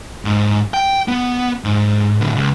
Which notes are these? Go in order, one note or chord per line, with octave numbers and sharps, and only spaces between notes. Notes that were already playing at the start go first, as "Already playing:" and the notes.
G#2
G5
B3
G#2
A2 D3
C#2